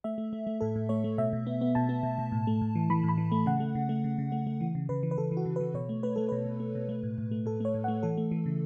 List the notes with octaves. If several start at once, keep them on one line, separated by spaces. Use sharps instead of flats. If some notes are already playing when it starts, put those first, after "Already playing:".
A3 E5
A3
A3
A3
A2 A4
A2
A3 C#5
A3
B2 E5
B2
B3
B3
B2 A5
B3
B2
B2
A2
A3
A2
E3
E3 B5
A2
B5
E3
A3
C#3 F#5
A3
C#3
A3
C#3
C#3
A3
A3
E3
C#3
C#3 B4
E3
B4
E3 A4
E3
F#4
C#3
E3 B4
B2 C#5
A3
A3 B4
A3 A4
B2 B4
B2
A3
B2
A3
A2
A2
A3
A2 A4
A3 C#5
A2
A3 F#5
E3 A4
A3
E3
C#3